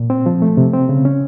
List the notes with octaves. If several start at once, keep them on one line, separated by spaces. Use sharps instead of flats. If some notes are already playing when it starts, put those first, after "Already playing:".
Already playing: A#2
C4
F3
A3
C3
C4
C#3
C#4